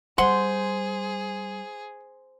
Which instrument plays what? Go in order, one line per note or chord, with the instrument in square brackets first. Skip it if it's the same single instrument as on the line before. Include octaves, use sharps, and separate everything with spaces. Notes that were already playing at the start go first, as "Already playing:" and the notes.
[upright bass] G3 [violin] G#4 [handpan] C5 [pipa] F#5 C6